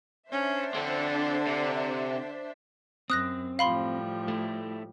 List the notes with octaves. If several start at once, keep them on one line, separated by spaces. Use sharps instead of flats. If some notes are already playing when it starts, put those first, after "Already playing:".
C#4 D4 C5 E5
D3 C4 A4
C3
F#2 C4 D#6 F#6 A#6
A2 F3 G3 F5 B5 C6
A3 E4